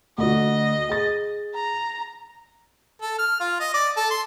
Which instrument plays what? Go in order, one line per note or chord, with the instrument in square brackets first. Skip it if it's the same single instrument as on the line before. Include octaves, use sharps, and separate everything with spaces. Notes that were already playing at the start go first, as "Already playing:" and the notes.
[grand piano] D2 D3 F#4 [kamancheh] D#5
[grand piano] G#4 A6
[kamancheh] A#5
[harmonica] A4
F6
F4
D#5
D5
A4
C6